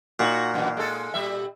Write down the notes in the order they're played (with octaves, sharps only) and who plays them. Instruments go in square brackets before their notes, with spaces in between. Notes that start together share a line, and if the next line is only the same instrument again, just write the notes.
[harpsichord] A#2 [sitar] D#4 F#4
[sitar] F#2 B2 E3
G#3 A4
A#2 G3 E5